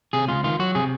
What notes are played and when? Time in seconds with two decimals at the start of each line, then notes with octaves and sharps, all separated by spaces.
0.13 C3 G#4
0.28 C#2 F4
0.44 D#3 F4
0.59 F#3 F#4
0.75 C3 G#4